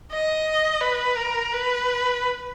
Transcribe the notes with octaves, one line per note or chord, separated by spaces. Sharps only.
D#5
B4
A#4
B4